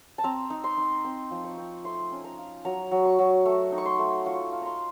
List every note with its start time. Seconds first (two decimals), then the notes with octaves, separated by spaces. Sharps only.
0.18 A5
0.24 C4 A#5
0.50 D#4
0.64 C6
0.78 D#4
1.05 C4
1.31 F3
1.44 C#6
1.57 C4
1.84 A3 C6
2.11 C#4
2.24 A#5
2.38 F4
2.65 F#3 A#5
2.91 F#3
3.05 C#6
3.19 F#3
3.45 A3
3.72 D#4
3.78 C#6
3.85 C6
3.99 A3
4.26 F4 C#6
4.52 F4
4.62 A#5 C6